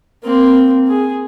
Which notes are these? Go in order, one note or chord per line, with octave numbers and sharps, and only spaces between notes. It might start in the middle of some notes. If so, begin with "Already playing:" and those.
A#3 C4
G#4